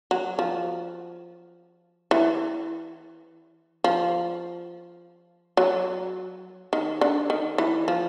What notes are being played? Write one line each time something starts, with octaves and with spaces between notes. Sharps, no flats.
F#3
F3
E3
F3
F#3
D#3
D3
D#3
E3
F3